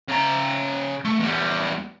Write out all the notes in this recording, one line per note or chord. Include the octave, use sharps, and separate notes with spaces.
C#3 A#5
A3
E2 G3